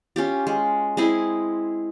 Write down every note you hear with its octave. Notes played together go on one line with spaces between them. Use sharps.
C#4 F4 G4
G#3
G#3 C4 E4 G#4